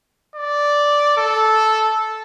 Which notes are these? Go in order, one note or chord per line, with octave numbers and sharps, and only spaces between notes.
D5
A4